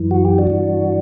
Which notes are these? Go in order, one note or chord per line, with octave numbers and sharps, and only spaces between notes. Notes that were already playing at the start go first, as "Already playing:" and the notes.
Already playing: F#2 E3
F#4
G4
D4 F#4
G2 E3